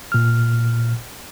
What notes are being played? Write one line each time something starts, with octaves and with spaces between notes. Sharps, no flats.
A#2 F6